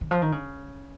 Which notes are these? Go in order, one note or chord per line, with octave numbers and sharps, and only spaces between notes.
D#3
F3
D#3
C#3